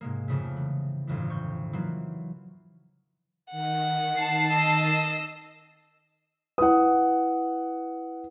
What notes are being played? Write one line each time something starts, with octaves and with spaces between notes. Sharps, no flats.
G#2 C3 G#3 A#3
F2 C#3 A3
E3
G1 F2 A2 E3
C#6 G6
E3 F#3 A#3 D#4 F4
D#3 F#5
A5 C7
D#5 E6
E4 B4 F#5 D#6